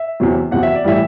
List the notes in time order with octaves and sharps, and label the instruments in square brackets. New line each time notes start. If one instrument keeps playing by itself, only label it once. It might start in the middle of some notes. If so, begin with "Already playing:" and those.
Already playing: [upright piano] E5
E2 C3 F#3
E2 C3 F#3 F#5
E5
D5
A2 E3 G3 E5